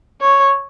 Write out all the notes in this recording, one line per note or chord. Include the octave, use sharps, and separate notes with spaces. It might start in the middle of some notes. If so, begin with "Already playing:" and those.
C#5